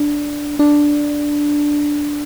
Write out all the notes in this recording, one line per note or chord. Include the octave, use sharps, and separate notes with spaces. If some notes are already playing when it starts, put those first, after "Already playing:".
Already playing: D4
D4